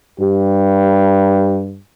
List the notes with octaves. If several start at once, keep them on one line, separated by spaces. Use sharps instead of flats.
G2 G4